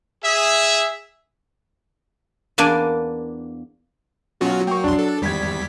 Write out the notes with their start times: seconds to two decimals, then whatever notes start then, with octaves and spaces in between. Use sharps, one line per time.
0.24 G#4 E5
2.58 E2 A#3 D4 G#5
4.41 B2 F#3 C#4 F4 F#4
4.67 A#3 G5 C#6
4.84 A#1 E2 D4 C6
4.99 A4
5.22 G#1 E2 G3 G#6 B6